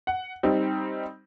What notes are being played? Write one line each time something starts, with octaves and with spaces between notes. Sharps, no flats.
F#5
G3 C4 D#4